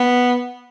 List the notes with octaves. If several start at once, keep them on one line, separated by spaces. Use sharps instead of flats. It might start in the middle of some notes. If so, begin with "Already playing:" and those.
Already playing: B3